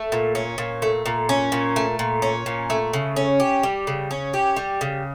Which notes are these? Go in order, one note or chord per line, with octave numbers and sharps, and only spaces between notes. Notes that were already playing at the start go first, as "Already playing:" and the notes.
Already playing: A3
A#2
C#4
A#2
A3
A#2
C#4
A#2
A3
A#2
C#4
A#2
A3
C#3
C#4
G4
G3
C#3
C#4
G4
G3
C#3